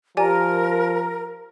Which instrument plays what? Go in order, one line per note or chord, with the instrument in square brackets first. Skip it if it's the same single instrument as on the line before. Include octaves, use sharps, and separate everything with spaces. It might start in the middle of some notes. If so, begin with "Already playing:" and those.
[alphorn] F3 [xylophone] G4 D5 G#5 [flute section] A#4